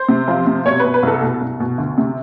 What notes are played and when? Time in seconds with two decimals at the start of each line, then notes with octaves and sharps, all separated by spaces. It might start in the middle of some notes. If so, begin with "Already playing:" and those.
Already playing: C5
0.09 C3
0.28 F3
0.47 C3
0.65 B2 C#5
0.80 B2 B4
0.94 B4
1.03 C2 A4
1.22 B2
1.41 C2
1.60 B2
1.78 D2
1.98 C3